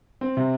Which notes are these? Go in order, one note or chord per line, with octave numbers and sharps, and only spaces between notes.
C4
C3